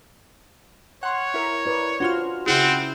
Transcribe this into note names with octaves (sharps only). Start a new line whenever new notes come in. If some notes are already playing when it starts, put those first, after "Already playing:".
C#5 F#5 C6 F6
E4 A#4
B4 D5
D4 F4 F#4 C5 F6
C#3 C4 E4 G#4 F#5